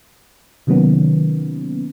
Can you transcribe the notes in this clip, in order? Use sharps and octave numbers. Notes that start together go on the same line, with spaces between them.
C3 D#3 F#3 A#3 B3 C#4